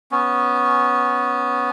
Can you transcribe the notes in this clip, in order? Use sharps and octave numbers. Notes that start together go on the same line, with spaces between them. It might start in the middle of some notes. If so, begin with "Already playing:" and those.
B3 C#4